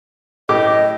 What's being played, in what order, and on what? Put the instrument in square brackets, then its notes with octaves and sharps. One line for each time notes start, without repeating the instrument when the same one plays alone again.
[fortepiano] A2 G4 D6 [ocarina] D#5